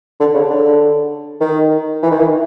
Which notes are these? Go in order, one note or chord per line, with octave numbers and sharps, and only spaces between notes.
D3
C#3
D3
D#3
E3
D#3
E3